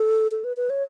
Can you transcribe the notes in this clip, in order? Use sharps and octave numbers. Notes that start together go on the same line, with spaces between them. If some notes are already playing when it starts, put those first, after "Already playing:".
Already playing: A4
A4
B4
B4
C#5